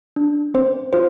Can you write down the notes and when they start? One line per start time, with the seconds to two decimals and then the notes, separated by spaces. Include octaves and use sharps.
0.16 D4
0.54 C4 C5
0.93 F4 C5